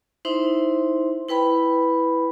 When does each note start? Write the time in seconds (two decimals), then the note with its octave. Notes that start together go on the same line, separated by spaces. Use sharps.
0.25 D#4 E4 C5 E5 C6
1.28 E4 B4 G5 B5